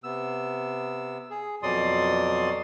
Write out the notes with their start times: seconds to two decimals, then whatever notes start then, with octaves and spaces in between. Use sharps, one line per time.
0.04 C3 B3 E6
1.30 G#4
1.63 F2 B2 F#3 D5 C6 D#6